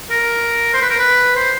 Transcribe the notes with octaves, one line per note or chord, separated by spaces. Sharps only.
A#4
C5
B4
A#4
B4
C5